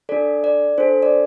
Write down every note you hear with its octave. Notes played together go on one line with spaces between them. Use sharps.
D4 A4 D5
D5
D4 A4 C5
D5